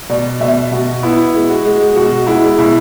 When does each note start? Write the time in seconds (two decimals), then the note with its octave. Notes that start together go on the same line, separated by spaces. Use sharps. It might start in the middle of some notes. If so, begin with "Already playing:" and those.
0.09 B2 D5
0.41 B2 E5
0.71 B2 F#4
1.03 B3 E4
1.34 G#3
1.49 F#4
1.65 G#3
1.96 B2 F#4
2.27 G#3 E4
2.58 B2 E4